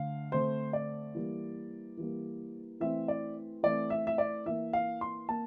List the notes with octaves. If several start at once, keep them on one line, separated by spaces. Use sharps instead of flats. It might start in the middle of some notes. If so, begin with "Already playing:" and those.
Already playing: D3 A3 F5
D3 A3 C4 C5
D5
E3 G3 A#3
E3 G3 A#3
E3 A3 C4 E5
D5
E3 A3 C4 D5
E5
E5
D5
E3 A#3 E5
F5
C6
A#3 A5